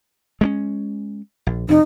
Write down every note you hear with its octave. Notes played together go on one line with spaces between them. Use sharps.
G#3 A3 C#4
A#1
F2 C3 D#4